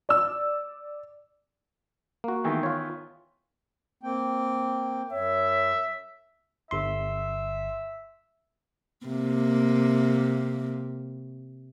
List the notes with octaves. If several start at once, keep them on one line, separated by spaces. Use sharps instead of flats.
D5 E6
A#3 F#4
D#3 E3 B3
F4 C#5
A#3 C4 G5
F#2 C#5 E5
G1 E5 C6
C3 A#3